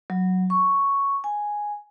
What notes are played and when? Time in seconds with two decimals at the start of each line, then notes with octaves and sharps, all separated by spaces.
0.10 F#3
0.50 C#6
1.24 G#5